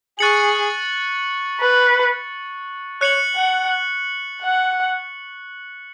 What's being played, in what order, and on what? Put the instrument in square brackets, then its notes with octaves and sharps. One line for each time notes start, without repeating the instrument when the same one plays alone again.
[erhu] G#4 [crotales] C#6 F#6 A6 C#7 F#7
[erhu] B4
[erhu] C#5 [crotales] F#6 C#7 F#7
[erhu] F#5
F#5